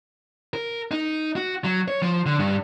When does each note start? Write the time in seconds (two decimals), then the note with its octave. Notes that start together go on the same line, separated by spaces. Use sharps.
0.54 A#4
0.91 D#4
1.36 F#4
1.64 F#3
1.88 C#5
2.02 F3
2.26 D3
2.39 G2